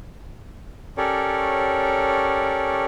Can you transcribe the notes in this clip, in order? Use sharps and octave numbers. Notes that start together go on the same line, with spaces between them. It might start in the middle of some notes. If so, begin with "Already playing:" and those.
C#4 G4 A4 A#4 C#5 D5